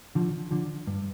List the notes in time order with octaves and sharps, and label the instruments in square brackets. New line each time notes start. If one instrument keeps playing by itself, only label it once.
[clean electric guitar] D3 F3
D3 F3
G2